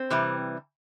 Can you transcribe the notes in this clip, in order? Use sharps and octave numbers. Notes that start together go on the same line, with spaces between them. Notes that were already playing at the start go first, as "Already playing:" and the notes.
Already playing: C4
C3 E3 G3